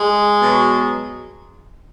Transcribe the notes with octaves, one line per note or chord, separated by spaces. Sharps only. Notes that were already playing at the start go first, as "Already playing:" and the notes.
Already playing: G#3
B2 F#3